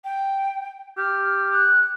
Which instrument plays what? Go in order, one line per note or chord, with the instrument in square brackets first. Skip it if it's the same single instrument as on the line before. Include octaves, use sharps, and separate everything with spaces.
[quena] G5
[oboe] G4 [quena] F6
[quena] F#6